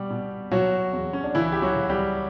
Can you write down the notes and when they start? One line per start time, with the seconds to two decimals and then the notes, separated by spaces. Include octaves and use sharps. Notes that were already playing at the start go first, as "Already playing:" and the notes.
Already playing: B2 G3 G4
0.11 B2
0.51 B2 F#3 F#4
0.93 E2
1.13 C#4
1.24 D4
1.34 C#2 E3 E4
1.52 G4
1.62 F#3 F#4
1.76 C#2
1.89 G3 G4